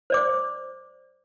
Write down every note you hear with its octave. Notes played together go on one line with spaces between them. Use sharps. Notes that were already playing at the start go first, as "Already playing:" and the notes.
C5 D5 D6